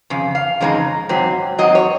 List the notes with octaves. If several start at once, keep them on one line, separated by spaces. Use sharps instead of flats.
F2 C#3
F5
F2 C#3 G#3 C4 D#4
G#2 F#3 C4
G#2 F#3 C4 D#5
C#5